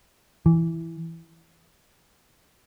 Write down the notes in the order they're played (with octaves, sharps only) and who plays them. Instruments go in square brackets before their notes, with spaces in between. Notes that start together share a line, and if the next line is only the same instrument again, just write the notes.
[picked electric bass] E3